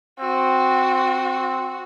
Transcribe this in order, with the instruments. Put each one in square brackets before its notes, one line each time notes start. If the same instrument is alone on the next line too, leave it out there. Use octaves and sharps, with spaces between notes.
[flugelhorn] C4 [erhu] F#4